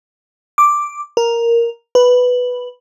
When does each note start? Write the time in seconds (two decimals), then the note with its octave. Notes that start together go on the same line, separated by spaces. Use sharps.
0.58 D6
1.17 A#4
1.95 B4